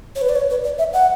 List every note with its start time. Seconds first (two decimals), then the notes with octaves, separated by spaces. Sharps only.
0.16 C#5
0.21 B4
0.29 D5
0.36 C#5
0.50 B4
0.64 D5
0.79 E5
0.93 F#5